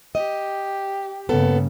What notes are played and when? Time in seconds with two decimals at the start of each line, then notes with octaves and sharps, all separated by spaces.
0.15 G4 D#5
1.29 G2 C#3 A#3 B3 A4